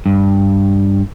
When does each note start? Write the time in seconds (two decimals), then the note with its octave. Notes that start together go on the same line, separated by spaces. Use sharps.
0.06 G2